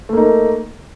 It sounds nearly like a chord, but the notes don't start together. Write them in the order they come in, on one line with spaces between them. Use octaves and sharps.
A3 A#3 D#4